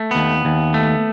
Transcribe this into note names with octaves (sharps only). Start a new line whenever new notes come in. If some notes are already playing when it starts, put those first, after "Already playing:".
Already playing: A3
D#2 B3
D#2
A3